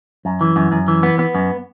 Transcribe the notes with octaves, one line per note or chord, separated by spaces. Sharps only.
F#2
E3
F#2
F#2
E3
B3
B3
F#2